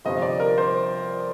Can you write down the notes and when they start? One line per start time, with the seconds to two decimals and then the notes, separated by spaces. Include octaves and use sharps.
0.05 G1 F2 C3 F3 D#5
0.22 D5
0.40 A#4
0.58 C5